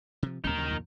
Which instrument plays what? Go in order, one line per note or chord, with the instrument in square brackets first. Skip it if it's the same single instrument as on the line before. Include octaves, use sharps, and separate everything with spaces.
[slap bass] C3 F3
[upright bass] D#2 [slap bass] A2 G#3 C#4 [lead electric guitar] D#4 A#4
[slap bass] C#3 F3 F#3
F2 A#2 D#3